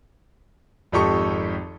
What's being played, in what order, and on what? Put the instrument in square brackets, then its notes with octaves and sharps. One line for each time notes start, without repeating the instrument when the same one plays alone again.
[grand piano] G#1 F2 D#4 G4 A4 C#6